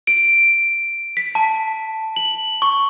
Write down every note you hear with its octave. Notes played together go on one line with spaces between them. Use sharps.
D7
B6
A5
F#7
C#6